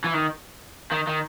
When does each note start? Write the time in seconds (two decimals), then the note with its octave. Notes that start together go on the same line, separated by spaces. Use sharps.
0.04 E3
0.14 D#3
0.91 D#3
1.07 D#3